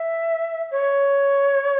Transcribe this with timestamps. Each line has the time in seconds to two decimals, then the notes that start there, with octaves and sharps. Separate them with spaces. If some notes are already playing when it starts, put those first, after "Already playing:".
Already playing: E5
0.71 C#5